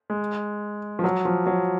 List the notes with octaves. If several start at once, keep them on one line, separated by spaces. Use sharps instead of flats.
G#3
F3
F#3
F3
F#3